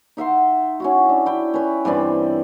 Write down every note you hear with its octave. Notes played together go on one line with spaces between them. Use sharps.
D#4 E5 F#5 C6
C#4 E4 F#4
D4
E4 G5
C#4 B4
G2 E3 C4 D5